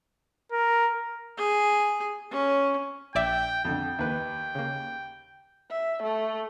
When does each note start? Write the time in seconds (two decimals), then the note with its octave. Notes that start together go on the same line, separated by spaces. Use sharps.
0.52 A#4
1.38 G#4
2.31 C#4
3.15 A#1 D5 E5 G5
3.65 F2 D3 G5
3.99 D#2 B4
4.55 C#3 A#3
5.70 E5
6.03 A3